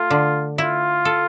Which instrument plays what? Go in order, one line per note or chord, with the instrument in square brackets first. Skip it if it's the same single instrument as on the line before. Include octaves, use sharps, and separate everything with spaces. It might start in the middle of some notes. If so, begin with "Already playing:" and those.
Already playing: [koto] A3 [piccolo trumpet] F4
[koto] D3
[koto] E4 [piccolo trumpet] F4
[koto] A4